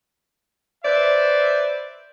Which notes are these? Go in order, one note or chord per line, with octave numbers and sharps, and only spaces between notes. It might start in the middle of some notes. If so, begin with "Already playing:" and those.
B4 C5 D5 E5